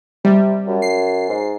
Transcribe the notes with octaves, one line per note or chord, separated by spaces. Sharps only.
C3 G3
F#2
C7
G#2